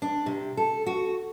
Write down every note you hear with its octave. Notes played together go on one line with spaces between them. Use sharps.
D4
C3
A4
F#4